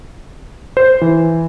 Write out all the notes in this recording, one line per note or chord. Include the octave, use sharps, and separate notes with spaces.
C5
E3